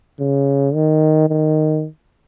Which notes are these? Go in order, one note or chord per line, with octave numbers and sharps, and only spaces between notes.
C#3
D#3
D#3